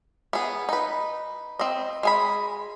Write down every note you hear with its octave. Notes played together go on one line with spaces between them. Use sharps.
B3 G#4
D#4 B4
C4 D#5
G#3 G#4 B5